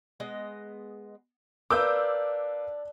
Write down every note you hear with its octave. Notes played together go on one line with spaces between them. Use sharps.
G#3 B3 D#5
D4 A#4 B4 F5 D6 E6 G6